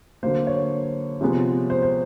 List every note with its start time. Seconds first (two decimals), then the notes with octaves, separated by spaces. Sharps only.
0.23 D3 F#3 A#3 C5
0.47 C#5
1.21 C3 F3 G#3 B3
1.70 C5
1.83 C5